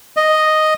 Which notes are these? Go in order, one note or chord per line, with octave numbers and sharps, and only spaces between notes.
D#5